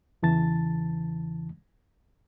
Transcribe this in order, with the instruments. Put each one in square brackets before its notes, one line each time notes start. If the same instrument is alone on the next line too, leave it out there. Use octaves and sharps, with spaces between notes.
[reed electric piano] E2 C#3 E3 A5 A6